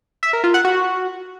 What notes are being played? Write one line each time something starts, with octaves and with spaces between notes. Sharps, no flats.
E5
A#4
F4
F#5
F#4